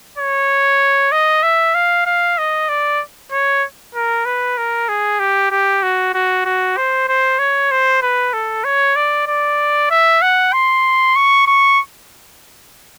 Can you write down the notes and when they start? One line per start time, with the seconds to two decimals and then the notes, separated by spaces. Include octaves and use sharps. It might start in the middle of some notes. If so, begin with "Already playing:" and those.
0.18 C#5
1.12 D#5
1.43 E5
1.75 F5
2.06 F5
2.38 D#5
2.69 D5
3.31 C#5
3.95 A#4
4.25 B4
4.57 A#4
4.88 G#4
5.19 G4
5.51 G4
5.83 F#4
6.14 F#4
6.45 F#4
6.77 C5
7.08 C5
7.39 C#5
7.71 C5
8.02 B4
8.33 A4
8.64 C#5
8.96 D5
9.27 D5
9.90 E5
10.21 F#5
10.53 C6
11.16 C#6
11.47 C#6